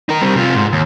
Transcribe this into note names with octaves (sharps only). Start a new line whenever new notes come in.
D#4 A#4
G3 C4
C3 F4
G#2
D#2